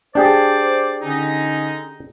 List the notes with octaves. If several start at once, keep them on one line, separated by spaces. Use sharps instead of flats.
D4 G4 G#4 C5 D5
D3 C#4 D#4